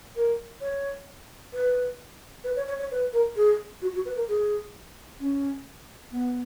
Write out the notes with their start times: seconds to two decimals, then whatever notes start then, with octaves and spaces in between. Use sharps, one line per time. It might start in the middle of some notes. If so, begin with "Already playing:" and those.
0.16 A#4
0.61 C#5
1.53 B4
2.44 B4
2.56 C#5
2.68 C#5
2.79 C#5
2.91 B4
3.13 A#4
3.36 G#4
3.82 F#4
3.94 F#4
4.05 B4
4.16 A#4
4.28 G#4
5.20 C#4
6.12 B3